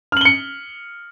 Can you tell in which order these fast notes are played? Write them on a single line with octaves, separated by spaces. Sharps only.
F6 F#7 G7 C#7